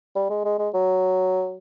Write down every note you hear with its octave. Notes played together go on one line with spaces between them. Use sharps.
G3
G#3
G#3
G#3
F#3